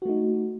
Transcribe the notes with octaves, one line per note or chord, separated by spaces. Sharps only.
A3 D#4 F#4